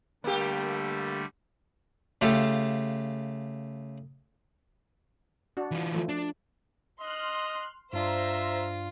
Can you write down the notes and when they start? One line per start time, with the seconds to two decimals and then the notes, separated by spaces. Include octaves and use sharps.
0.24 D3 G3 A3 A#3 G4
2.21 C#3 A3 F4 G4 A4
5.57 D4 F#4
5.71 E3 F4
5.94 F3 A3
6.09 D4
7.01 D#5 C6 F6 F#6
7.93 G2 D4 F4 C5 D5 E5 A#5